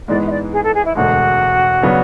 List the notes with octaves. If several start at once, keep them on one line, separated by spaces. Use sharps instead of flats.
G#2 E3 G#3 B3 D5
E5
D5
G#4
A4
G#4
E4
E1 D2 D3 G#3 F#4
C#3 F#3 B3 D4